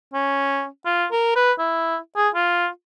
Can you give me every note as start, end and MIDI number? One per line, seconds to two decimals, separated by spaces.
0.14 0.67 61
0.86 1.07 65
1.12 1.31 70
1.36 1.52 71
1.59 1.98 64
2.17 2.29 68
2.35 2.68 65